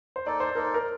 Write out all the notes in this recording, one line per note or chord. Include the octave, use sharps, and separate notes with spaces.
C5
A#3 D#4 A4 D5
C5
A#3 D#4 A4 A#4
C5
A#4